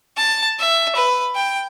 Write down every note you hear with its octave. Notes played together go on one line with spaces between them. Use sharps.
A5
E5
B4
G5